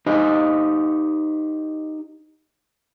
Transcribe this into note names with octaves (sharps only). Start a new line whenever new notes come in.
D#4 G4 C5 D#5